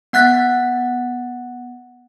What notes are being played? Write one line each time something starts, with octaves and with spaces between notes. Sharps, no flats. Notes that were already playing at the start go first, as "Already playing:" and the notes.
B3 F#5 F#6 A6 B6